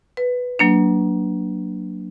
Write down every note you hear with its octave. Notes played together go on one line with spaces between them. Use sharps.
B4
F#3 A#3 D4